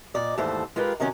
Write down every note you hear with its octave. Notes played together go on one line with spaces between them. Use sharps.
A#2 D5 D#5
D#2 G#2 E3 A3 A4 C5
G#3 F4 G4 A#4 B4
C3 D#3 F#3 C#4 G4